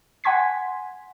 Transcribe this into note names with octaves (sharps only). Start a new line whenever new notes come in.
F#5 G#5 C6 G#6 B6